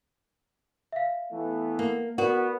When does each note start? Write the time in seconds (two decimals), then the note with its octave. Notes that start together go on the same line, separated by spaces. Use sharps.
0.92 E5 F5
1.32 E3 A3 B3
1.79 A#3
2.18 B3 F#4 A#4 D5 F#5